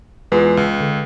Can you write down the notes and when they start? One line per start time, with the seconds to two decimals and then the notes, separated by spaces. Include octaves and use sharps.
0.32 E2 G#3 F4 B4
0.57 C#2
0.81 D3